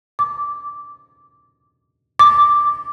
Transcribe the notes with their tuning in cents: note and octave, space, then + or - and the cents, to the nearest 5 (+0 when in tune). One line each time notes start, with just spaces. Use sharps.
D6 -5
D6 +0